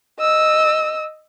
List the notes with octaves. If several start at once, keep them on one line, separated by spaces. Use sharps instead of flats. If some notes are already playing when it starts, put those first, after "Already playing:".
D#5 E6